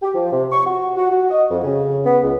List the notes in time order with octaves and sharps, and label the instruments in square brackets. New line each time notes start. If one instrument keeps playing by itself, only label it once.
[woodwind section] G4
F3
C3
C#6
F#4
F#4
F#4
D#5
F2
C#3
B3
C#2